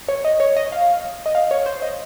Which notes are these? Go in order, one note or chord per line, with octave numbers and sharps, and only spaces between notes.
C#5
D#5
C#5
D#5
F5
D#5
F5
C#5
C5
D#5